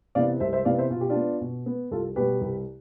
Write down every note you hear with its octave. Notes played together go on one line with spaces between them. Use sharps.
C3 E3 B3 D5 F5
C2 C5 E5
C5 E5
C3 E3 B3 D5 F5
C5 E5
B2 F4
G4
D4 F4
B3
B2
B3
C2 F4 A4
B2 G3 G4 B4
C2